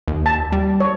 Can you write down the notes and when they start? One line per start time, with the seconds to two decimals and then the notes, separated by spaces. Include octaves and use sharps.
0.08 D#2
0.26 A5
0.52 G3
0.80 C#5